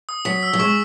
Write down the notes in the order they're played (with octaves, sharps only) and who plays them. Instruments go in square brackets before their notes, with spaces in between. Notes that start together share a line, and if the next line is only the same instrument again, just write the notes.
[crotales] D#6
[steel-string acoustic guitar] F#3 [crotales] B6
[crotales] E6
[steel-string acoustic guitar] F#3
[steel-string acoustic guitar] G#3 [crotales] C#6